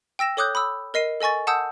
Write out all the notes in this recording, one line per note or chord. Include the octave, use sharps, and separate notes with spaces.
G5 E6 A#6 E7
A4 C#5 D6 D#6 F#6 G6
B5 D#6 E6
A#4 D#5 C7 D#7
A4 D#5 G#5 C#6 A6
F#5 A5 D#6 E6 G6